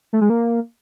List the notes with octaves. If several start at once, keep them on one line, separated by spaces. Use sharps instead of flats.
A3
G#3
A#3